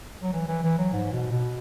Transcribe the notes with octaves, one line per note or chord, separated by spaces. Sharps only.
F#3
E3
E3
E3
F#3
G#2
B2
B2